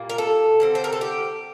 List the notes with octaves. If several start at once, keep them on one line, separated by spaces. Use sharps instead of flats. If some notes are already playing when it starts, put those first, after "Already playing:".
Already playing: A#2 G3 A#3
A#4
A4
D3 G3 C4
C5
A#4
A4
G4